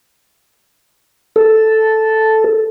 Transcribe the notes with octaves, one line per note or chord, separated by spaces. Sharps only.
A4